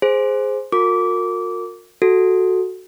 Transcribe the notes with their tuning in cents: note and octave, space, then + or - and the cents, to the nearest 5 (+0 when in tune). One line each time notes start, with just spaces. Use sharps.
G#4 +0 C5 +0
F#4 -45 A#4 -30 D6 -20
F#4 +0 A4 +0